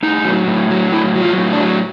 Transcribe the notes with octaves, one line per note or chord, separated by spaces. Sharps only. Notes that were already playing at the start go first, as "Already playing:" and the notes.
A2 D#4
F#3
A2
F#3
A2 E4
F#3
F4
A2
D4
F#3